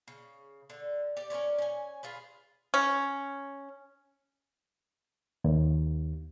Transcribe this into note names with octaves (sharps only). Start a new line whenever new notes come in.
C#3
D3
G4 D5
C#4 A#4 C#5 D5
C#4 G#5
F4 G#4 B4
C#4
D#2